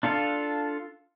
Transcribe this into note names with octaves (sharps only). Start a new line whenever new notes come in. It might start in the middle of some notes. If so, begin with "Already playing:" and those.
D4 F4 A4 F5